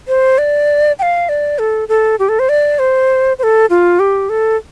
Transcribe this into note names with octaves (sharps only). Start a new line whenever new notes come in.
C5
D5
G5
F5
D5
A4
A4
G4
A4
C5
D5
C5
C5
A4
F4
G4
A4